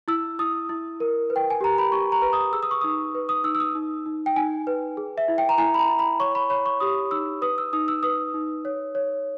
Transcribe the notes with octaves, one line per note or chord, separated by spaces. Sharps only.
E4 E6
E4 D#6
E4
A#4
B4
G5
G#5
G4 A#5
B5
G4 C#6
A#5
B4
D#6
G#4 E6
D#6
C#6
D#4 D#6
B4
D#6
D#4 E6
E6
D#6
D#4
D#4
G5
D#4 G#5
B4
G#4
E5
E4
G5
A#5
E4 G#5
B5
A#5
E4
B5
C#5 C#6
B5
C#5 B5
C#6
G4 D#6
D#4 E6
B4 D#6
E6
D#4 D#6
E6
B4 D#6
D#4
C#5
C#5